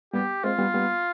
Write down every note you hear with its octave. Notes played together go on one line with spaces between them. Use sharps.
G3 B3 G4
G#3 C4 F4
G3 B3
G3 B3